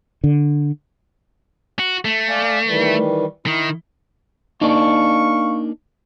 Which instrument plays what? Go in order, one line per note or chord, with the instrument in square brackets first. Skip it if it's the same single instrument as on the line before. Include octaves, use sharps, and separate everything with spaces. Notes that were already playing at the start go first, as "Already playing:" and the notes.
[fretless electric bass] D3
[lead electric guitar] F#4
A3
[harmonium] D5 F5 G#5
D#3 E3 G3
[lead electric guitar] D#3 [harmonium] E4
[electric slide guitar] A#3 D4 D#4 [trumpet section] F5 C#6